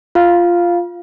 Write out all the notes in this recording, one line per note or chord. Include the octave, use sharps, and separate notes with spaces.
F4 F5